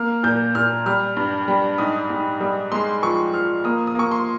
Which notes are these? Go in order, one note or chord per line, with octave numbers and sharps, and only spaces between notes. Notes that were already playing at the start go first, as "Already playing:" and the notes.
Already playing: A#3 F6
A#2 G6
A#2 F6
G3 F6
G2
G3
G#2 D#6
G#2
G3
G#3 C6
F3 C#6
F3 F6
A#3 D#6
D#6
A#3 C#6
C6